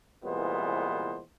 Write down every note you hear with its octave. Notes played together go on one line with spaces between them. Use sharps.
C2 A#2 E3 G#3 B3 C5